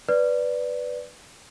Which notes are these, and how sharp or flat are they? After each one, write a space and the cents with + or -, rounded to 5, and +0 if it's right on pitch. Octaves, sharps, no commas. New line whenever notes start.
B4 +0 D5 +0